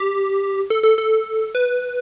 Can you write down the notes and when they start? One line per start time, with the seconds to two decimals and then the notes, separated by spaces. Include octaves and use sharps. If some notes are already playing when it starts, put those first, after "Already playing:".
Already playing: G4
0.70 A4
0.83 A4
0.98 A4
1.55 B4